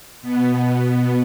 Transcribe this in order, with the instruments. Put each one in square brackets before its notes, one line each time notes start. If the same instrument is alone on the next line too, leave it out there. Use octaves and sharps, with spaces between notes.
[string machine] B2 B3